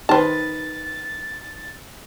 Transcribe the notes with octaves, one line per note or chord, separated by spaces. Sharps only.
D#3 B4 C5 A5 A6